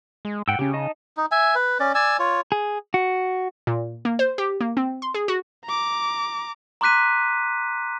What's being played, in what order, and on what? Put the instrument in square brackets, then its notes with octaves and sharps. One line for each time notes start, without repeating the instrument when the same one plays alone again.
[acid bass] G#3
[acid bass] G#2 [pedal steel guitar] F#5 G5 E6
[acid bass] C#3 [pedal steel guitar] C#4 G4
[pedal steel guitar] D#4 D#5 A5
[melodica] D#4
E5 G#5
B4
C#4 D5
D5 G#5 E6
F4 C#5
[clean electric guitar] G#4
F#4
[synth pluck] A#2
A#3
C5
G4
A#3
C4
C6
G#4
F#4
[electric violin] A#5 D6
[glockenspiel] A#5 C6 D6 F#6 B6 D#7